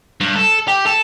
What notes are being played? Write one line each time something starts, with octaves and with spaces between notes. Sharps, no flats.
G2
A4
G4
A4